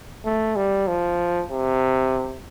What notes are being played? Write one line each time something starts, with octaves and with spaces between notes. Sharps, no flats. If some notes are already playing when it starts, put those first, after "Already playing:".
A3
G3
F3
C3